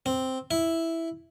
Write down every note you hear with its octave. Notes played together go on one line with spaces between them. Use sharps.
C4
E4